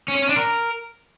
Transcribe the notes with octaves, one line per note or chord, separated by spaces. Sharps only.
C#4
C#5
C#4
D4
A#4